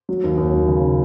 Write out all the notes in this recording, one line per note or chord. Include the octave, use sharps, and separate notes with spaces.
F#3
D#2
D#2
F#3
C#3